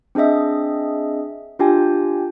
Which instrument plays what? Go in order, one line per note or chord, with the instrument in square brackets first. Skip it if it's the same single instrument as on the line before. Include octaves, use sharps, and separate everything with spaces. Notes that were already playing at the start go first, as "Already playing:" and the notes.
[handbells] C4 D4 G#4 D#5 E5
D4 F4 G4 G5 G#5